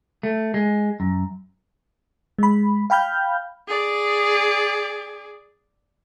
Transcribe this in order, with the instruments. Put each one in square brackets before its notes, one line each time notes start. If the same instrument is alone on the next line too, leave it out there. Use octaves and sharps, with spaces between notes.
[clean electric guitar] A3
G#3
F#2
[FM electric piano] G#3 B5
F5 G5 B5 F6 G6
[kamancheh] G#4 D5